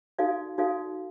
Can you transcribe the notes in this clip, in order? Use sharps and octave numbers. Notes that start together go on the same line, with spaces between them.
D#4 F#4 A4 D5 F5
D#4 F#4 A4 D5 F5